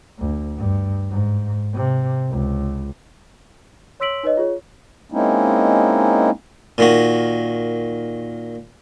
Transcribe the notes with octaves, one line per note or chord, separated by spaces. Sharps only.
D2
G2
G#2
C3
C#2
C#5 C6 E6 B6 D7 F#7
D#4 B4 C#5 D#5
F4 G#4 C#5
G#3 A#3 C4 C#4 D#4 E4
A#2 D#3 F#4